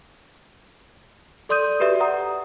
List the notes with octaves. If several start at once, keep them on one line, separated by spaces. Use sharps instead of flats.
A4 D5 C6 D#6 G6 D#7
F#4 G4 B4 D5 E5
F#5 A#5 D#6